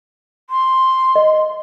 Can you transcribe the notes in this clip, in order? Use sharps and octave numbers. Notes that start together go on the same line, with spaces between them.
C6
D#5